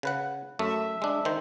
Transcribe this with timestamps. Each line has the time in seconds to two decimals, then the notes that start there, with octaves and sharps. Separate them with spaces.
0.03 C#3 B4 F#5
0.59 F#2 A3 E5
1.02 G#3 D4
1.25 D#3 C5